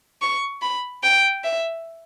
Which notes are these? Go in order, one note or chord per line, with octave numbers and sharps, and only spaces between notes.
C#6
B5
G5
E5